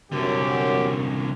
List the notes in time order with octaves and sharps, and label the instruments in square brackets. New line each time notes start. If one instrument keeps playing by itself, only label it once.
[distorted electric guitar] C2 D3 [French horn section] F#2 [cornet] G4